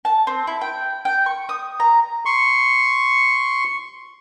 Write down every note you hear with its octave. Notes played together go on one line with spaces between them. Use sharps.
A5
C4
E4
G5
G5
C#6
D#6
A#5
C6 C#6